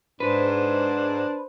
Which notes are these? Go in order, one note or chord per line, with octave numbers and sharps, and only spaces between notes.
G#2 D4 B4 C5